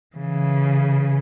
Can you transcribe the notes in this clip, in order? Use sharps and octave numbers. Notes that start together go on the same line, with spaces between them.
C#3 E3